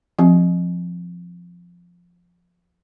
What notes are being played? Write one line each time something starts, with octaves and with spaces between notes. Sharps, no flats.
F3 C4